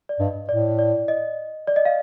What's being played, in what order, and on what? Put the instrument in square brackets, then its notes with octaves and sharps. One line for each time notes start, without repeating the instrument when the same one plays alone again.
[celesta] D5
[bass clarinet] G2 [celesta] D#5
[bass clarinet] A2 [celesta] D5
[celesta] D5
D#5
D5
D#5
F5